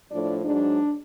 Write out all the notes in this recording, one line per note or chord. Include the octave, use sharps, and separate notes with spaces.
A2 F3 D4
G#2 F#3 D4